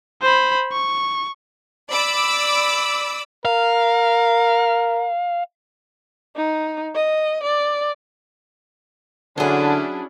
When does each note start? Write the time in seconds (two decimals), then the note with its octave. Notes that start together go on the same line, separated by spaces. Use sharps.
0.22 C5 B5
0.72 C#6
1.89 D5 B5 D6 E6
3.45 A#4 F5
6.36 D#4
6.95 D#5
7.43 D5
9.38 D3 F#3 C#4 D4 E4 G#4